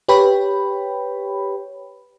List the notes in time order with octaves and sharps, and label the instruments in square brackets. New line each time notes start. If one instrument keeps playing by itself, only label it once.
[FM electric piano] G4 B4 C#5 G5 B5